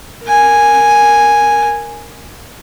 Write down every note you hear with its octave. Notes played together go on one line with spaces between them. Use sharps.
A#4 G#5